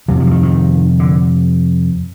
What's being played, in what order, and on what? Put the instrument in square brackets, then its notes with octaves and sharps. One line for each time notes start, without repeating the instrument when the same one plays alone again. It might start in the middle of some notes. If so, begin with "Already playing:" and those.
[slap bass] F2 C3 F#3
F3
E3
D#3
D#3
D3